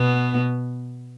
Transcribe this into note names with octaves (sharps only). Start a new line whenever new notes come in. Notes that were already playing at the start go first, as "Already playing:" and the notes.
Already playing: B2 B3